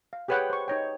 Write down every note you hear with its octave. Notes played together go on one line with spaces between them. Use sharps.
F5
G4 G#4 B4 C#5 F#5 G5
C5 C#6
D#4 C#5 G5